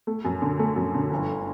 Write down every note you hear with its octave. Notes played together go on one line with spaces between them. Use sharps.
A3
F#2
D3
A3
F#2
D3
G1